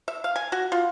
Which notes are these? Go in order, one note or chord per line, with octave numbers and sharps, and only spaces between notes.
E5
F5
G#5
F#4
F4